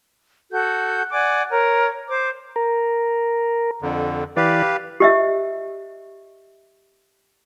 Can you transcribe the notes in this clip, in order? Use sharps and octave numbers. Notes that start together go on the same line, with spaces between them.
F#4 A4 G6
D5 F#5 G#5 D6
A#4 C#5
C5 D6
A#4
F2 D3
E3 G4 B4 D5 F5
G4 D#5 E5